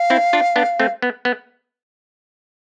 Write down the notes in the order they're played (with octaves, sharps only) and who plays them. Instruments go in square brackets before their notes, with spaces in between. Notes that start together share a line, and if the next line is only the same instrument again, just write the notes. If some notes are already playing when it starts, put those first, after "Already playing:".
Already playing: [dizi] F5
[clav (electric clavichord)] C4 E4
D4 F4
B3 D4
A3 C4
B3
B3